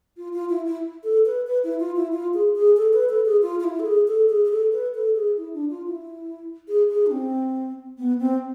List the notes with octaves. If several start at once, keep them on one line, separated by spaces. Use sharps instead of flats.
F4
F4
E4
E4
A4
B4
B4
E4
F4
E4
F4
G#4
G#4
A4
B4
A4
G#4
F4
F4
E4
A4
G#4
A4
G#4
G#4
A4
B4
A4
G#4
E4
D4
F4
E4
G#4
G#4
D4
C4
B3
C4